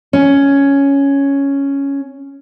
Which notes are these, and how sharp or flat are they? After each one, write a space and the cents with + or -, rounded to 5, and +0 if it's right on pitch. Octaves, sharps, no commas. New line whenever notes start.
C#4 +5